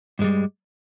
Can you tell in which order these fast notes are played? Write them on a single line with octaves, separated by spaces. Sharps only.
G2 G#3 G3